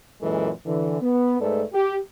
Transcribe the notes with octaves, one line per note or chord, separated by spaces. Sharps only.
F#2 A#2 E3 G#3 A4
D3 E3
B3
G#2 A3 A4 B4 D5
G4